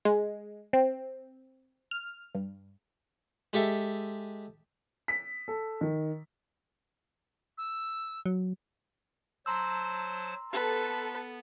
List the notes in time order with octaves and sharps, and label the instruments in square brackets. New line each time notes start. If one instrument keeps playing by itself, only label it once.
[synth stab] G#3
C4
F6
G2
[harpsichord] G#3 G4 A4 E5
[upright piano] B6
A4
D#3
[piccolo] E6
[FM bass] F#3
[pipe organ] F#3 C5 A5 [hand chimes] A#5 C6 E6
[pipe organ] B3 [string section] A4 [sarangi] B4